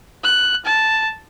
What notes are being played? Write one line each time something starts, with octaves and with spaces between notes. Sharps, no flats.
F#6
A5